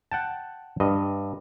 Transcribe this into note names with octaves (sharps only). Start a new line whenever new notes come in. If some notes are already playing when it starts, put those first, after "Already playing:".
F#5 G5 A5
G2 D#5